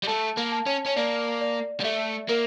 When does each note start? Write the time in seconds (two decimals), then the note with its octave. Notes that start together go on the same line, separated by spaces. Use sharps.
0.03 G3
0.07 A3 A5
0.37 A#3
0.52 A5
0.66 C#4
0.86 C#4
0.96 A#3 D5
1.41 D5
1.80 G3
1.84 A3 E5
2.29 A#3 A#4